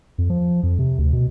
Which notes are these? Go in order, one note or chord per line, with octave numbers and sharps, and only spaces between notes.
F2
F3
F2
C3
D2
B2